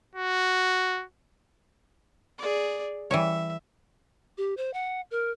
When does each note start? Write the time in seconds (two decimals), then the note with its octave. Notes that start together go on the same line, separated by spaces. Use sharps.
0.16 F#4
2.38 G#4 D5
3.11 E3 G3 C#5 E5
4.38 G4
4.57 C5
4.74 F#5
5.11 A#4